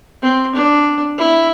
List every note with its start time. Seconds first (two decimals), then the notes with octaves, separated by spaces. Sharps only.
0.22 C4
0.55 D4
1.18 E4